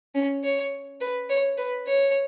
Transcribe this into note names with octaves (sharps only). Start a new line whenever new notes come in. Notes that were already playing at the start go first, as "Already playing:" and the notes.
C#4
C#5
B4
C#5
B4
C#5